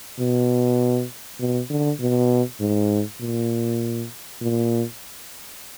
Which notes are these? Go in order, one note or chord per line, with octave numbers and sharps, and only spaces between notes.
B2
B2
D3
B2
G#2
A#2
A#2